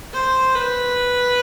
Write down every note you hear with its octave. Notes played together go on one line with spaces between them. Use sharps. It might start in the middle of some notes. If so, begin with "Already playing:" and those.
C5
B4